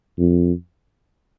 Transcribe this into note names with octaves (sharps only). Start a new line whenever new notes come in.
F2